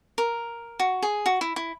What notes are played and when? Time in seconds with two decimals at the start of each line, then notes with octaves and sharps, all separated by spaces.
0.18 A#4
0.79 F#4
1.02 G#4
1.26 F#4
1.41 E4
1.56 E4